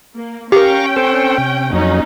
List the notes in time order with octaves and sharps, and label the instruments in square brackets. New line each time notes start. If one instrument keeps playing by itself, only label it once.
[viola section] A#3
[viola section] C#4 G5 [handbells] G4 A#4 [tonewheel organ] F5 A#5 C#6
[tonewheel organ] C4 A4 C5
C3
[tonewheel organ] F2 F#3 [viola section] A#3 C#4 D#4